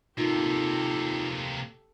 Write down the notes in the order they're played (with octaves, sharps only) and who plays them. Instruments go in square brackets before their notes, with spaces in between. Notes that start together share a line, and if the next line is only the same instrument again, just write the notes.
[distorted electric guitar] C3 A#3 [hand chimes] D#4 F4 [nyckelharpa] G4 A4